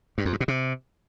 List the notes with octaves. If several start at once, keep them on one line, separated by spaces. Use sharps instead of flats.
G2
F2
G2
B2
C3